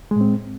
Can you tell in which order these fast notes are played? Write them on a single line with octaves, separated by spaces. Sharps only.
G#3 A2 C4